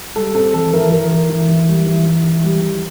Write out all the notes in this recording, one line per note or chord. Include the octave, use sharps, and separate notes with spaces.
G3 A4
C4 A4
E3 A4
E3 A#4
E3 A#4
E3
E3
E3
G3
E3
E3
E3
G3
E3